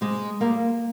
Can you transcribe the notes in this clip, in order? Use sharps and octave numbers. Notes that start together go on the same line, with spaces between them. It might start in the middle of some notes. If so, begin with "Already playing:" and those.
C3 G#3
G3 A#3